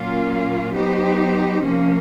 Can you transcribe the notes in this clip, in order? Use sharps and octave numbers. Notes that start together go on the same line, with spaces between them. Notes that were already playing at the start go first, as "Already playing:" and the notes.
Already playing: A#2 F#3 A#3 C#4 F4
F#3 B3 D#4 G4 C5
C3 F3 A#3 C#4